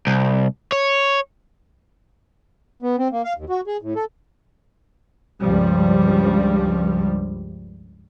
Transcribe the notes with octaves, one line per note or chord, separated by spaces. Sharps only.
C2
C#5
B3
C4
A#3
F5
D#2
F#4
G#4
A2
A4
C#2 G2 F3 G3